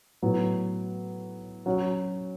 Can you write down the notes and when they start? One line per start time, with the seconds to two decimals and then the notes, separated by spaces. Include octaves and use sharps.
0.22 A2 F#3 B3
1.66 F#3 C#4 F#4